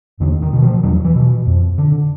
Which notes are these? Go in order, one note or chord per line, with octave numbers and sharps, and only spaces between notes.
E2 D3
D#3
B2
F3
E2 F#3
E3
B2
F2
D3